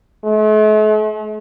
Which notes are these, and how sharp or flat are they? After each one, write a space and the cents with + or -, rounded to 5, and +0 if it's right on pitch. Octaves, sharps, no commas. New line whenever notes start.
A3 -45